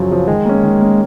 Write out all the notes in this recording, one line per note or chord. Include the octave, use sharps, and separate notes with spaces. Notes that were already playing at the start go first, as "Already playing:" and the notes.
Already playing: F#2 C#3 F3 F#3
C#3 F3
D#3 G#3
A#3 C#4
D#3
A#3 C#4